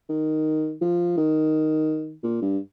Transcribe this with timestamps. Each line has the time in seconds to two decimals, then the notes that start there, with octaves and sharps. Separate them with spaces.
0.09 D#3
0.81 F3
1.17 D#3
2.23 A#2
2.42 G2